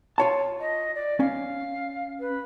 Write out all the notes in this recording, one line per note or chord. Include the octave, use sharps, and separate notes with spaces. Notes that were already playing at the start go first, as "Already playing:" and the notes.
F4 C#5 A5
D#5
D5
C#4 F5
B4